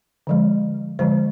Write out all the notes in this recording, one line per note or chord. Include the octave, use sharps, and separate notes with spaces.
D3 F3 G#3
D3 F3 G#3 C5